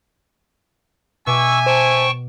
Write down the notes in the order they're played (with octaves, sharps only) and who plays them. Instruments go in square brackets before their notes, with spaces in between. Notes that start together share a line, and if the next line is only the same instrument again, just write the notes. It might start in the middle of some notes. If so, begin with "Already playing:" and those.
[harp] B2 D6 [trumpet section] E5 G#5 [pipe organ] C#6 E6
[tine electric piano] C5 [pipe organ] G5 A5 C#6